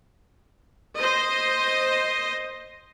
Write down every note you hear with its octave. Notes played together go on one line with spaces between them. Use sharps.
C5 D#5